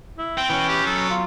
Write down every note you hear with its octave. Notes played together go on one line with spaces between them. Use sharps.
E4
C4 G5
E3 B3 C#4 F#4
G4
F#3 A4
F4